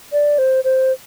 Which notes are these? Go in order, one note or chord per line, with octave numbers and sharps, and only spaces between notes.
D5
C5
C5